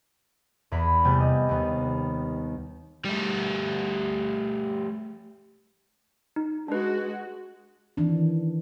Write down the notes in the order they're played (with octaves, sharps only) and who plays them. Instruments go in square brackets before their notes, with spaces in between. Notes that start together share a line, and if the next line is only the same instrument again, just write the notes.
[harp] E2 E3 A#5 B5
C3 G3 B3 G#5 G6
D#5
D#2 B3
[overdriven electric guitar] G3 A3
[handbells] D#4
[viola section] G#3 F#4 [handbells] D4 B4
[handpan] D#3 E3 C4 D4